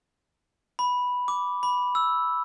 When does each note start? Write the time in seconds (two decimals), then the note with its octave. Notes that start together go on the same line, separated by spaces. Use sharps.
0.79 B5
1.28 D6
1.63 B5
1.95 E6